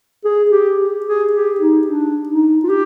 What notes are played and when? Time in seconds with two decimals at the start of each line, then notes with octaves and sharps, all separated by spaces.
0.24 G#4
0.51 G4
0.79 G4
1.06 G#4
1.33 G4
1.60 D#4
1.87 D4
2.29 D#4
2.64 F4
2.69 G4